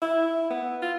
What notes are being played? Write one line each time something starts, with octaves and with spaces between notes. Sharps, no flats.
E4
B3
F4